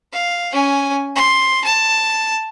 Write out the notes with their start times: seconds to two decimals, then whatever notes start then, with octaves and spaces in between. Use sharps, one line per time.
0.12 F5
0.53 C#4 G#5
1.16 C6
1.64 A5